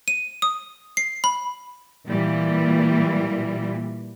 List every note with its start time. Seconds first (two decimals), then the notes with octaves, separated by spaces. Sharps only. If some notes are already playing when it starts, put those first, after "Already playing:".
0.08 D#7
0.42 D#6
0.97 C7
1.24 B5
2.07 A#2 E3 G3